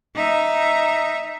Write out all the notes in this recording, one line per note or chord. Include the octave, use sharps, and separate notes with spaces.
D#4 E5